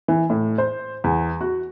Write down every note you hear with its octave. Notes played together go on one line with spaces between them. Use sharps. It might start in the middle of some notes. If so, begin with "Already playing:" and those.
E3
A2
C5
E2
F#4